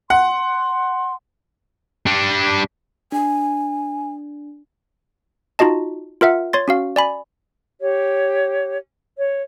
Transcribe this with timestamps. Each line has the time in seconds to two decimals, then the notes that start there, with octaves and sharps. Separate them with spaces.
0.10 F#5 C6
2.06 G3 D4
3.12 D4 G#5
5.59 D#4 F4 F#4 D#5 A5
6.21 F4 A#4 E5 F#5
6.53 C#5 C6 A6
6.68 C#4 F#4 F5
6.96 D5 G#5 B5
7.81 G4 C#5
9.18 C#5